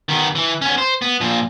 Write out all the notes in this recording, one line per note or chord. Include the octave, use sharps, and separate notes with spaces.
D#3 B3
E3
B3 C#4
C5
B3
A#2 F3